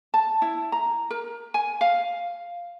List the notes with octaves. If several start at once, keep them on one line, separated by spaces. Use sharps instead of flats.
A5
E4
A#5
A#4
G#5
F5